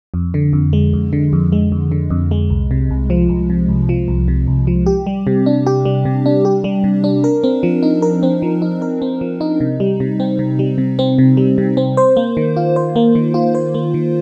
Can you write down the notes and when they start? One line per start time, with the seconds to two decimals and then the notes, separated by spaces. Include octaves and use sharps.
0.14 F2
0.34 D3
0.53 F2
0.73 G#3
0.93 F2
1.13 D3
1.33 F2
1.52 G#3
1.72 F2
1.92 D3
2.10 F2
2.31 G#3
2.50 C2
2.71 C3
2.90 C2
3.10 F3
3.29 C2
3.50 C3
3.69 C2
3.89 F3
4.08 C2
4.28 C3
4.47 C2
4.67 F3
4.86 G4
5.07 G3
5.27 C3
5.46 D4
5.66 G4
5.85 G3
6.05 C3
6.26 D4
6.45 G4
6.64 G3
6.84 C3
7.04 D4
7.24 A#4
7.44 C4
7.63 F3
7.83 D#4
8.02 A#4
8.23 C4
8.42 F3
8.62 D#4
8.82 A#4
9.02 C4
9.21 F3
9.41 D#4
9.60 C3
9.80 G3
10.00 C3
10.20 C4
10.39 C3
10.59 G3
10.78 C3
10.99 C4
11.18 C3
11.37 G3
11.58 C3
11.77 C4
11.97 C5
12.17 A#3
12.37 D#3
12.57 F4
12.76 C5
12.96 A#3
13.15 D#3
13.34 F4
13.55 C5
13.74 A#3
13.94 D#3